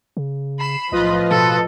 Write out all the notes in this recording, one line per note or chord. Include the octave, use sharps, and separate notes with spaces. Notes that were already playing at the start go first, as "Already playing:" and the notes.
C#3
B5 C7 E7
B1 A2 F3 F4 B4 D#5
B2 A4